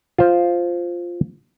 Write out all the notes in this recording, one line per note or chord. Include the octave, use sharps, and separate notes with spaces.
F4 C5